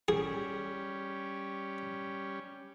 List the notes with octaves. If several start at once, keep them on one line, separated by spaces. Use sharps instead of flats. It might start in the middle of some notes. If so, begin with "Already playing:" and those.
G3 C#4 G#4